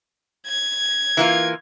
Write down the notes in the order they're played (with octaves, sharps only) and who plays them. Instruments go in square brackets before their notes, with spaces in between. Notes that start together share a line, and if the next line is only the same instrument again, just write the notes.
[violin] G#6
[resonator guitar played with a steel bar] E3 A#3 F4